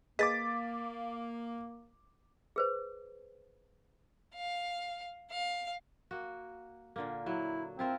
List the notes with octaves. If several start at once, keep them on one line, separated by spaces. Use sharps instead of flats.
A#3 G#4 B4 D#5 D6 A6 B6
G#4 B4 C5
F5
F5
A#3 F#4
A#2 D3 A#3
F#3 E4
C4 E4 F4 A#4